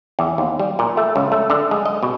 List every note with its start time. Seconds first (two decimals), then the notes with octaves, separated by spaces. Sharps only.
0.19 E2
0.38 D#2
0.60 G3
0.79 A#2
0.97 A3
1.16 C#2
1.32 A3
1.50 D3
1.71 G#3
1.86 D#5
2.03 B2